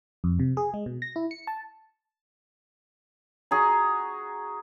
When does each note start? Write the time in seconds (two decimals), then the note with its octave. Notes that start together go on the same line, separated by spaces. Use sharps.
0.24 F2
0.39 C3
0.57 G#4
0.74 G#3
0.86 B2
1.02 A#6
1.16 E4
1.31 C#7
1.47 A5
3.51 F#4 G#4 A#5